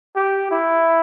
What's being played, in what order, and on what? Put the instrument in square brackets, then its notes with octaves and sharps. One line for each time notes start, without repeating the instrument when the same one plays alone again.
[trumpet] G4
E4